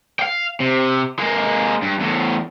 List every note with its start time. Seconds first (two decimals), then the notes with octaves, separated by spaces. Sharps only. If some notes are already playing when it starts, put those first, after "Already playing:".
0.19 F5 G5
0.60 C3
1.19 G#3 A#3
1.82 G2
2.00 E2 A2